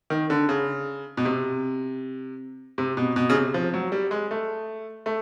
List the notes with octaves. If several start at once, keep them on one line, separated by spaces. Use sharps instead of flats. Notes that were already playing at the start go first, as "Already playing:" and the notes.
D#3
D3
C#3
B2
C3
C3
B2
B2
C#3
C3
F3
F#3
G3
G#3
A3
A3